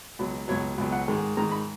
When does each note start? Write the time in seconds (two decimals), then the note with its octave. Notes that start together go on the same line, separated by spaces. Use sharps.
0.19 C#2 B2 F#3
0.48 C#2 B2 F#3 C#5
0.78 C#2 B2 F#3
0.92 F#5
1.08 G#2 D#3 G#3
1.37 G#2 D#3 G#3 A#5
1.51 B5